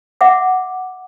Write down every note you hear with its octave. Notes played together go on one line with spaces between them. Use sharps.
E5 F#5 D6